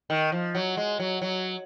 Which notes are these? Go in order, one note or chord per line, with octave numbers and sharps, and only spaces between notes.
D#3
F3
F#3
G#3
F#3
F#3